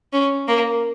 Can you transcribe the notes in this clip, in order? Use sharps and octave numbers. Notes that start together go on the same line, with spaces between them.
C#4
A#3